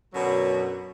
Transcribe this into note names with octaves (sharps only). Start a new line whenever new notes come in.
F#2 B2 D3 F#3